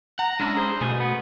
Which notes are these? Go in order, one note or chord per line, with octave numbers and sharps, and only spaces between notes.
F#5 A#5
G#3 C#4 D4 E4
G#4 C5
B2 A3 G#4
B3